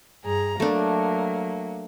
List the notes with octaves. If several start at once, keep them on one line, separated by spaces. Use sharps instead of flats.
G2 G#4 A#5
F#3 A3 A#3 D4